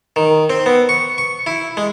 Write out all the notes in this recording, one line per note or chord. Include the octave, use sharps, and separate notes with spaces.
D#3
C4
B3
C#6
C#6
E4
G#3